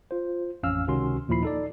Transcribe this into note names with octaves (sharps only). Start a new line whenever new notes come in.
F4 C5
A1 F2 C#4 F5 E6 F6
C#2 C3 D#3 C#4 F#4 C6
D#2 A#2 F3 E4 B5 C7
D#4 A4 D5